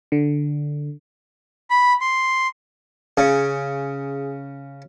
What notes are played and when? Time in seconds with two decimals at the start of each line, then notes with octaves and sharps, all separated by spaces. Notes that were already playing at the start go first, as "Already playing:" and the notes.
0.12 D3
1.70 B5
2.01 C6
3.17 C#3 G#4